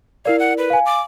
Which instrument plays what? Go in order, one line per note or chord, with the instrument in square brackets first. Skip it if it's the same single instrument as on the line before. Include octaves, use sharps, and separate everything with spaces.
[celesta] E4 A#4 D5 [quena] F5
[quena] F#5
B4
[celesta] F5 G#5
[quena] D6